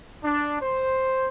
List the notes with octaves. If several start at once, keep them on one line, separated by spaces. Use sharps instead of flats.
D4
C5